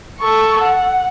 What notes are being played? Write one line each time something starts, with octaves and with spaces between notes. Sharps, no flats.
A4 C#6
F#5